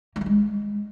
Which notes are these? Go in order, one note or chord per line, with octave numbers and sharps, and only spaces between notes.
A#3
A3
G#3